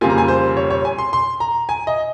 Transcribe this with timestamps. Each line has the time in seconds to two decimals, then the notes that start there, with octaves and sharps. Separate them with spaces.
0.01 F2 C#3 G3 A#3 F4 G#5
0.10 A#5
0.18 G#5
0.28 C5
0.57 C#5
0.70 C#5
0.85 G#5
0.98 C6
1.13 C6
1.40 A#5
1.69 G#5
1.87 D#5